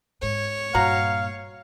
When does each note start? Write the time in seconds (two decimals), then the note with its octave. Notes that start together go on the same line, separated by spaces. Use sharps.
0.22 G#2 C#5
0.74 G2 A#2 F#4 F5 F#5 A#5